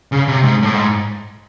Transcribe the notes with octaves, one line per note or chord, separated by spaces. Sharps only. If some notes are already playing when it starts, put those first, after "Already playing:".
C#3
C3
G#2
A2
G#2